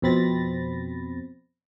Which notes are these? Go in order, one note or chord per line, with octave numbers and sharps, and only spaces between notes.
F2 B2 C4 B5 A6 A#6